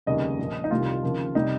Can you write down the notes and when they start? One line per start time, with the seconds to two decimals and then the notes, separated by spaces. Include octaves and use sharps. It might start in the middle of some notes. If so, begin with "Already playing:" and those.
0.06 F1 D#2 C#3 G3 D#5
0.39 A#1 A#2 F3
0.64 D#4
0.71 C2 C3 D#3 G3 F4
1.03 D#2 C#3 F3
1.35 C3 G3 D#4